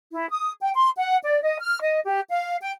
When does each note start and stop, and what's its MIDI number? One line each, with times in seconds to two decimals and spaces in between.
0.11 0.28 64
0.30 0.52 87
0.61 0.70 79
0.74 0.89 84
0.97 1.17 78
1.23 1.41 74
1.41 1.57 75
1.59 1.80 89
1.80 2.00 75
2.05 2.20 67
2.29 2.57 77
2.59 2.71 79